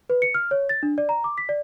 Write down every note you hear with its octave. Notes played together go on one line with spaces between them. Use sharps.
B4
C#7
F6
C#5
A6
D4
D5
A#5
D6
B6
D5